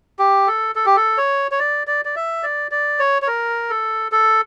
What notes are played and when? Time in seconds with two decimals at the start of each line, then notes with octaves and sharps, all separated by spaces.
0.19 G4
0.47 A4
0.75 A4
0.86 G4
0.96 A4
1.18 C#5
1.51 C#5
1.59 D5
1.87 D5
2.05 D5
2.16 E5
2.43 D5
2.71 D5
3.00 C#5
3.22 C#5
3.27 A#4
3.70 A4
4.12 A4